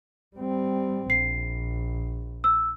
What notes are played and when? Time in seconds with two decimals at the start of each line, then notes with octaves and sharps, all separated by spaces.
0.36 G3 C4
1.10 A#1 C7
2.44 E6